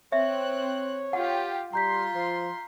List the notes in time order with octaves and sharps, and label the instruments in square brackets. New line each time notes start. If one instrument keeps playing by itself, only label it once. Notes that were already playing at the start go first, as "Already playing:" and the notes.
[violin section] C4 F#6 [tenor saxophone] C#5 [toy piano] E5
[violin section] F4 G4 [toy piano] F#5
[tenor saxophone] G3 [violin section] F4 C6 [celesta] A#5 G6 B6
[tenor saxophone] F3